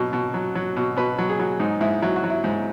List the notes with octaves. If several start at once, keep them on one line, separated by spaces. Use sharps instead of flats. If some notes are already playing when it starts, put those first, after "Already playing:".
Already playing: B2 F#3
B2
F#3
F#3
B2
B2 B4
F#3
G#4
F#3
G#2 D#4
G#2 E4
F#3 E4
F#4
F#3
E4
G#2